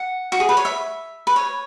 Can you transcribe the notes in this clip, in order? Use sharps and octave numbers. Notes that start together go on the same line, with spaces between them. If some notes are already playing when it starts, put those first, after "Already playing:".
Already playing: F#5
F#4
G#4
B4
C#5
E5
B4
C#5